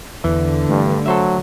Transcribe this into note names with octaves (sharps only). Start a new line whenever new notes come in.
E2 D3 E3
G2 A3
F#3 A4 C5 E5